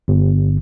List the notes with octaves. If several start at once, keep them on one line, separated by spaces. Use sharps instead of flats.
G1